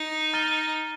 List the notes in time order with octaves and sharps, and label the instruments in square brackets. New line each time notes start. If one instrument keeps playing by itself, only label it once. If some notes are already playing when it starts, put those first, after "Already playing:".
Already playing: [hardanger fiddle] D#4
[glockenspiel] A#5 F6 A6 D#7 G7